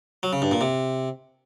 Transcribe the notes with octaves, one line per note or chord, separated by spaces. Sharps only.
F#3
C#3
G2
A#2
C3